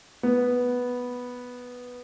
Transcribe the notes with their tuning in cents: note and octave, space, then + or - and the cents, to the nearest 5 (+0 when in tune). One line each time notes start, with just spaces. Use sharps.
B3 -5